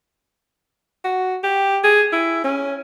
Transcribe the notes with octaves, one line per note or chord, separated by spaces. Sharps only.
F#4
G4
G#4
E4
C#4